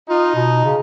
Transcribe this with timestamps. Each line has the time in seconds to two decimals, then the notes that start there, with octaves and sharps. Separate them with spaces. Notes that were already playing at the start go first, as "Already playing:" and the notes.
0.09 D#4 F4
0.35 B2
0.65 C#3